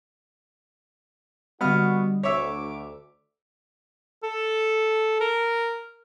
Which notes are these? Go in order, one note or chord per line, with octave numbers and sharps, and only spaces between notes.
D3 G3 B3 F#4 D#5 F6
D2 C#5 E5 D6
A4
A#4